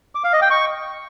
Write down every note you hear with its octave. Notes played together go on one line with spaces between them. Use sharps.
D6
F5
D#5
G5
C#6